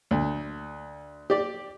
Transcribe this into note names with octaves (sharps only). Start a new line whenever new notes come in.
D2
G4 D5